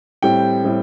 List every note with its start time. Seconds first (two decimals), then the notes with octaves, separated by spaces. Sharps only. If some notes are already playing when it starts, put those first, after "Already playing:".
0.23 A2 G3 C4 G5
0.65 A2 G3 C4